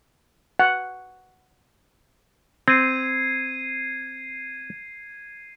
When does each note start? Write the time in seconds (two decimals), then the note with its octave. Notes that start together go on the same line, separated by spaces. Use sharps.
0.59 F#5
2.68 C4 G#6 C7 D#7